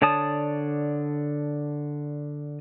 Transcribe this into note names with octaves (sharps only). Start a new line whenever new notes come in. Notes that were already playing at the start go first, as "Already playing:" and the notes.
D3 C#5 D5 A5 D#6